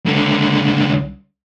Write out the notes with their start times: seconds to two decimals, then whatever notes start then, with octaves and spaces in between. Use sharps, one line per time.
0.05 C#2 D3